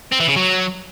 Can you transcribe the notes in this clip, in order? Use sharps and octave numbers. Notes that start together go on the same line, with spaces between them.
C4
E3
C#3
F#3